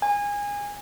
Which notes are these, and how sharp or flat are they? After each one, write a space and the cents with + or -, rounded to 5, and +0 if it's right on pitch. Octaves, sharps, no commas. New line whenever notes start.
G#5 -25